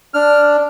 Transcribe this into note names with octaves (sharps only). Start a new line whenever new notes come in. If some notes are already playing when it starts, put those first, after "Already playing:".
D4 F6